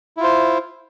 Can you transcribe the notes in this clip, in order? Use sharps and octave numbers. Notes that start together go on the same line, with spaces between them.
E4 F4 C5